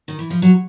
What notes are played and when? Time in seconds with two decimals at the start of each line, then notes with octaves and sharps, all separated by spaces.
0.08 D#3
0.19 E3
0.30 F3
0.42 F#3